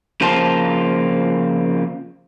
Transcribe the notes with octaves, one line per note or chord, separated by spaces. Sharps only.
C#3 F3 A#3 C4 F4 A5